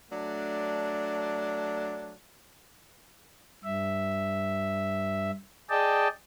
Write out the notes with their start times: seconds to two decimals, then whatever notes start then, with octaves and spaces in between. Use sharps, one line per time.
0.11 F#3 A3 D4
3.64 G2 E5
5.70 G#4 D5 D#5 G5 A5